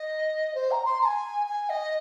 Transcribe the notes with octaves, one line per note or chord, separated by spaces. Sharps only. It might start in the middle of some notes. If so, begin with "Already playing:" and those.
Already playing: D#5
C5
A#5
C6
A#5
G#5
G#5
D#5